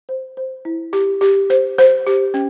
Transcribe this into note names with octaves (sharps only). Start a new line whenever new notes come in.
C5
C5
E4
G4
G4
C5
C5
G4
C#4